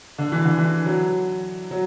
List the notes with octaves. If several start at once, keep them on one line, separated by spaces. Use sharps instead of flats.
D3
E3
D3
E3
F#3
F#3